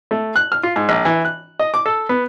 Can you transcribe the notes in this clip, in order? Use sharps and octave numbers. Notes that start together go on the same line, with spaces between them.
A3
F#6
F6
F4
G#2
A#1
E3
F#6
D#5
D6
A4
B3